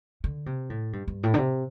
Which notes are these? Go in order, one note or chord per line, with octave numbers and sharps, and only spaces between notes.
D3
C3
A2
G2
G2
A2
D3
C3